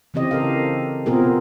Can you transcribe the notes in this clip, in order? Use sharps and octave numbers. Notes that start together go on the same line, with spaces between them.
C#3 E3 C4 G4 D#5
A4 A#4 F5
B2 B3 C4 F4 G#4 A#4